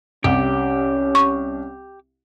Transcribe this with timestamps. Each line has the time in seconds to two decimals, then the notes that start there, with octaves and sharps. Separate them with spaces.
0.24 C2 C#4 G4 D6
1.15 C#6